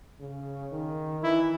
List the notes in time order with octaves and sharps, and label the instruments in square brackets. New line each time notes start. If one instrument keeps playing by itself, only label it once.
[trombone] C#3
D#3
[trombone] E3 [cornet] E4